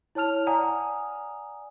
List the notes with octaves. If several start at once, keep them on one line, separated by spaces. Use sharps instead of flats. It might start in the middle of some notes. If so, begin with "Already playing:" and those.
E4 C#5 A5 F6 F7
D5 F#5 G#5 A#5 D#6